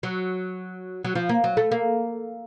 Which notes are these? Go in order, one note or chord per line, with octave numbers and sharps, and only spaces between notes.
F#3
F#3
F3
A#3
F#3
A3
A#3